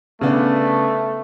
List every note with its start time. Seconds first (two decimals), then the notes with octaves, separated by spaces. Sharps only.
0.21 C#3 A3 B3 D4